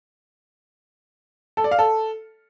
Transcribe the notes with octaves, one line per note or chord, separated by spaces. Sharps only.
A4
D5
F5
A4